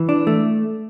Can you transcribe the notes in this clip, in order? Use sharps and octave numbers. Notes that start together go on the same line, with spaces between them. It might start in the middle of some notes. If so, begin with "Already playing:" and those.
Already playing: E3
D4
A3